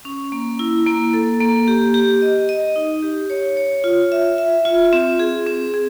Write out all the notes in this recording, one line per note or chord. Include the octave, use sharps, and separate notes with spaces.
C#4
A#3
E4
A#3
A4
A#3
G4
G4
D#5
D#5
D#4
G4
C#5
C#5
F4
E5
E5
F4
C4
G#4
C4
G#4